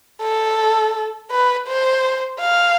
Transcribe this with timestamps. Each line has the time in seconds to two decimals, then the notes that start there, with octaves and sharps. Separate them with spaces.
0.21 A4
1.31 B4
1.67 C5
2.40 F5